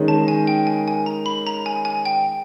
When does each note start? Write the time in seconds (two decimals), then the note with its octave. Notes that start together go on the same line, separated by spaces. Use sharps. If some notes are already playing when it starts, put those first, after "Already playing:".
Already playing: D#3 G#3 C#4
0.08 A5
0.28 G#5
0.47 G5
0.67 G#5
0.88 G#5
1.06 A#5
1.26 B5
1.47 A#5
1.66 G#5
1.85 G#5
2.05 G5